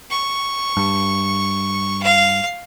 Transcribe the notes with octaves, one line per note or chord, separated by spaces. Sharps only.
C#6
G2
F5